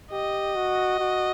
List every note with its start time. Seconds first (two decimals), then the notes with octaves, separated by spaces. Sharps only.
0.12 G4 D#5
0.55 F#4
0.99 F#4